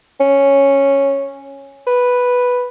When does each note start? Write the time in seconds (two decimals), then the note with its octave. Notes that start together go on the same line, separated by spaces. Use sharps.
0.20 C#4
1.87 B4